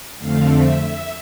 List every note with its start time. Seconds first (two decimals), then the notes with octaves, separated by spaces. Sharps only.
0.19 F2 D3 A3 C4 F5
0.49 E5
0.81 E5